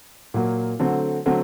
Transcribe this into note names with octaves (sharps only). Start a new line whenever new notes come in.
A#2 F#3 A#3
D3 F#3 A3 C4
D3 F#3 A3 C4